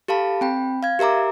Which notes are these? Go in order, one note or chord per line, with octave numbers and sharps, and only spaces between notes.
G4 A4 F5 A5 B5
C4 G5 B5
F5 G#6
G4 A#4 E5 A#5 D6